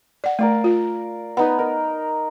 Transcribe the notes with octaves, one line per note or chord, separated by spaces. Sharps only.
D5 F#5
A3 A#4 D5 F5
F4
B3 D#4 B4 F#5
D#4 A#4